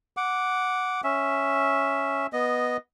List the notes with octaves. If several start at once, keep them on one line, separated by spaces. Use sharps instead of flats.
F#5 D6
C#4 E5
B3 D#5